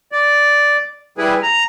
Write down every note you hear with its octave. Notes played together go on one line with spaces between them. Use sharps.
D5
G3 E4 G#4 B4
A#5